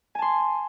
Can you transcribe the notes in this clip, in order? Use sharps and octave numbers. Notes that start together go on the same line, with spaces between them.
G#5 A5 C6